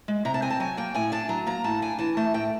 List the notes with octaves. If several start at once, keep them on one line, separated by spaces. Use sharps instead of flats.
G#3
C3 A#5
A5
C4 G#5
A5
F#3 G#5
A#3 G5
A2 G#5
D4 A5
F#3 A#5
A#3 A#5
A2 A5
D4 G#5
E3 A5
A3 A5
A2 G5